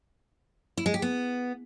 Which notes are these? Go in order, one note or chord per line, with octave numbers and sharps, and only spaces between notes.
E4
G#3
G4
B3